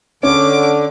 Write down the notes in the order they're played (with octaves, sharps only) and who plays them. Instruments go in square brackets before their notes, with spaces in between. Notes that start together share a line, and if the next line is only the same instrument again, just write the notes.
[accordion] D3 [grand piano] C#4 [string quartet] D6